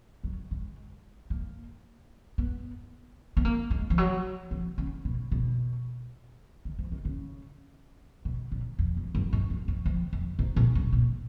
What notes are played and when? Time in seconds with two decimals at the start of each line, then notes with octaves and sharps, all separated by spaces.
0.24 F#3
0.51 G#3
1.30 A#3
2.38 B3
3.37 B3
3.45 A#3
3.71 G#3
3.90 F3
3.98 F#3
4.51 F3
4.78 C#3
5.05 B2
5.31 B2
6.65 D#3
6.79 F3
6.92 D#3
7.05 C#3
8.25 B2
8.52 A#2
8.79 F2
8.97 F2
9.15 F#2
9.33 G#2
9.50 F#2
9.68 F2
9.86 F2
10.13 F2
10.39 G#2
10.56 A#2
10.75 F#2
10.93 A#2